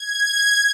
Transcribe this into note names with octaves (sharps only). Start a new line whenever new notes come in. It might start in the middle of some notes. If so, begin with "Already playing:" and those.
Already playing: G#6